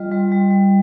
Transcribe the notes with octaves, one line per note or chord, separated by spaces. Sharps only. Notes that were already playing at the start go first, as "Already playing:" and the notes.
Already playing: G3 F4 D#5
G3
G3
G3